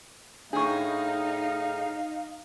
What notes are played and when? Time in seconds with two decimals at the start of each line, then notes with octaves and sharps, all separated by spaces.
0.53 A2 D4 D#4 G#4 F5 C#6